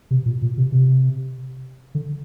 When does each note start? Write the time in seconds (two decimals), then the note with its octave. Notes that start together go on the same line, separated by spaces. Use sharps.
0.11 C3
0.26 A#2
0.42 A#2
0.57 C3
0.72 C3
1.95 D3